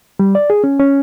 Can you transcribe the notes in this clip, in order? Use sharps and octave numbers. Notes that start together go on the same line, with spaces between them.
G3
D5
G#4
C#4
C#4